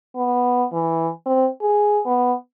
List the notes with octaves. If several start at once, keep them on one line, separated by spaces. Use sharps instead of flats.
B3
E3
C4
G#4
B3